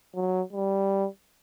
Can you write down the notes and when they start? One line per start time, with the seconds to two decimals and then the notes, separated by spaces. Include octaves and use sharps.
0.15 F#3
0.53 G3